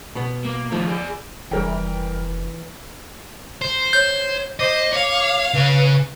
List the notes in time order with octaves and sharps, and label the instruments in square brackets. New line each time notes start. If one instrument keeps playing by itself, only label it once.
[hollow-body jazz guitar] B2 B3
[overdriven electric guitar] A#3
[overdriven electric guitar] D#3 A3 [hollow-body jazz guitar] F3
[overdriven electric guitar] G#4 D5
[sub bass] F1 [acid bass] E3 [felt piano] G3 A#4 G5
[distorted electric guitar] C5
[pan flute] C#5 [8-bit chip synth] G6
[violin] C5 C7 [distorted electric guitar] D#5 [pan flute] D6
[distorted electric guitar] C#5 [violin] F5
[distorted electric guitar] C#3 C#5 [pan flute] B4